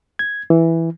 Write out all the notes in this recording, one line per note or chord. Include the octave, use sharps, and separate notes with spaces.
G#6
E3